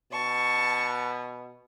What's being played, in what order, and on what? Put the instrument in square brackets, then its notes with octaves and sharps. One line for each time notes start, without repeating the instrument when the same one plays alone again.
[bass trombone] B2 [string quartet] A5 C#6